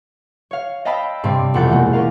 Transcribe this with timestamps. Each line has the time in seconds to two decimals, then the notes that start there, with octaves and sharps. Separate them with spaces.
0.51 C#5 F5
0.85 D#5 F5 G5 A5 B5 E6
1.23 G2 C3 C4 D5
1.54 E1 F2 F#5 G6 A6
1.69 E3 G#3 A#3 C#4
1.93 C#4 A#4 D5 F5